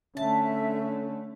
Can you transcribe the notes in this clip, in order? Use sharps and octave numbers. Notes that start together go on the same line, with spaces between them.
D3 A3 C#4 E5 A5